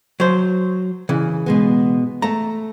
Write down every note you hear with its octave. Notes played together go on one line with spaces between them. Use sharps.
F#3 C5
C#3 E3
B2 G#3 B3
A3 A4 A5 A#5